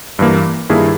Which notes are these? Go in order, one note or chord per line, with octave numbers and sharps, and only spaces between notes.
G2 E3 A#3
G2 D#3 A#3 E4 G#4